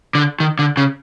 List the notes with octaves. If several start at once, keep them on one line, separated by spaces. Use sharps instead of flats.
D3
D#3
D3
C#3